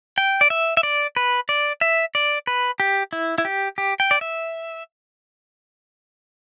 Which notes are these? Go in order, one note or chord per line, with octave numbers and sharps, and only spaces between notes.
G5
D5
E5
E5
D5
B4
D5
E5
D5
B4
G4
E4
E4
G4
G4
G5
D5
E5